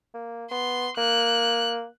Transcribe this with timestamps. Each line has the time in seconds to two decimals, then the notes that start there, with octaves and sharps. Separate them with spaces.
0.14 A#3
0.51 B3 C6
0.98 A#3 F#6